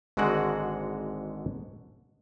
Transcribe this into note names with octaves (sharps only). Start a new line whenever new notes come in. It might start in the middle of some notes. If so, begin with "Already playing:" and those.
G#1 G#2 D3 G#3 F#4 F#5